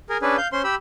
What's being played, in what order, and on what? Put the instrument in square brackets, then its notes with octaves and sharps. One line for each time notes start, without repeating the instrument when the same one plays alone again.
[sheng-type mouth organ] G#4 A#4
C#4 D4 G#4 B4
F5 G6
C#4 C5 C6
G4 B5 E6